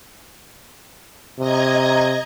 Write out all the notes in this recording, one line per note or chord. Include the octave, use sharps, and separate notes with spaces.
C3 D#5 A#5 G#6